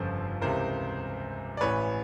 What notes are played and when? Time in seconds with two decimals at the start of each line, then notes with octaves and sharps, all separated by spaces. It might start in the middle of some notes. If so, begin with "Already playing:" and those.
Already playing: G1 F2 C#3 F3 A4 C5
0.41 C#2 C3 E3 A#4 C5
1.57 D5
1.61 A1 A2 E3 B4 C#5